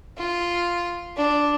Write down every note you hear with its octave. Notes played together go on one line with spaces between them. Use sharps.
F4
D4